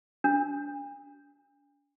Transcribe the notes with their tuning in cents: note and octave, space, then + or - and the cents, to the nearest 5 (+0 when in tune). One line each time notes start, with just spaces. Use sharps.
D4 -40